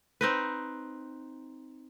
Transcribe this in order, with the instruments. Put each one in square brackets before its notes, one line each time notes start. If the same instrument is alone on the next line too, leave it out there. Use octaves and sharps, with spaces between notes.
[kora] C4 D#4 B4